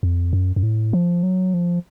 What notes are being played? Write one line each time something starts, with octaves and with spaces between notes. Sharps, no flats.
F2
F#2
F#2
A2
F3
F#3
F3